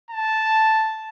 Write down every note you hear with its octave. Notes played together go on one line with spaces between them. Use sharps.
A5